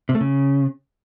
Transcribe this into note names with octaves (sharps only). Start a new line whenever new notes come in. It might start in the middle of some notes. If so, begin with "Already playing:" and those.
C3
A3
C#3